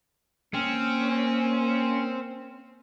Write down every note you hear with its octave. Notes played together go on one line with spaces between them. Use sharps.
A#3 C4 C#4